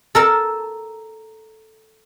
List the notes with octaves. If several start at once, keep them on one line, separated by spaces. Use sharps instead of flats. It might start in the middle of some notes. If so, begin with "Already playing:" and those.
A4 A#4 A5